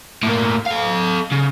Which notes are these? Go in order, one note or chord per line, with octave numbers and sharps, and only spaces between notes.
A2 A#3
A4 F5
C#3